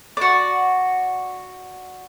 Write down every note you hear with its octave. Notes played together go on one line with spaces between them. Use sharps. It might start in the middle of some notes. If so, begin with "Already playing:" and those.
F#4 D5